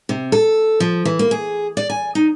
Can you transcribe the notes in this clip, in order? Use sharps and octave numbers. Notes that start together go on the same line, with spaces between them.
C3
A4
F3
E3
A#3
G#4
D5
G#5
D#4